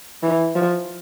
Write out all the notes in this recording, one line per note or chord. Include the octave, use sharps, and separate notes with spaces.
E3
F3